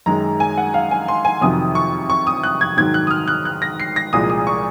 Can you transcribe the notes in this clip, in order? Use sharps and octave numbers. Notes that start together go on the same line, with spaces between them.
F#2 D#3 G#3 A#5
G#5
F#5
F5
G#5
C6
G#5
F2 C3 D#3 F#3 D#6
C#6
C#6
D#6
F#6
G#6
G#2 D#3 F#3 G#6
F#6
D#6
F6
F#6
F#6
A#6
C7
A#6
C2 A#2 F3 G#3 D#6
D#6
C#6